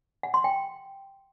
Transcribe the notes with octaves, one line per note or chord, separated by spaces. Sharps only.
F#5
C6
G5